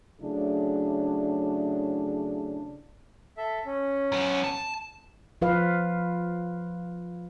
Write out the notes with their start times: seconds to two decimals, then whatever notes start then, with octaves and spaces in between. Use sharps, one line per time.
0.21 C#3 F#3 A3 D4 E4 G#4
3.37 A4 E5
3.66 C#4
4.12 F#2 B3
4.44 A5
5.42 F3 F4 B4 F5